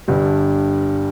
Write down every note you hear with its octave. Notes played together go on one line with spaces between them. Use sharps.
G1 G2 D3 G3